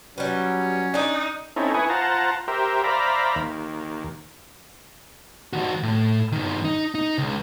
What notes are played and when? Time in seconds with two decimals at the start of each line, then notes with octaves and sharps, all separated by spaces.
0.18 F#3 G3 C#4 B4
0.94 D4 D#4 D5
1.56 C4 C#4 D#4 E4 A4
1.74 E4 B4 G#5 C#6 D#6
1.90 F4 C5 F#5 A5 A#5
2.48 G4 A#4 C5 E5
2.84 C5 D5 E5 F5 A#5 B5
3.35 D#2
5.53 D#3 F#4
5.83 A2
6.32 G2 D#3
6.64 D#4
6.95 D#4
7.18 C#2